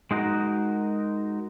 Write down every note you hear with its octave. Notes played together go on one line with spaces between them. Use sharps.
G#3 D#4 F#4 A#4